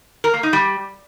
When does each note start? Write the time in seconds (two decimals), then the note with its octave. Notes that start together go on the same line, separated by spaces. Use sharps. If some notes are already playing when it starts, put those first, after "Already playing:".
0.24 A#4
0.34 A#3
0.43 D#4
0.53 G3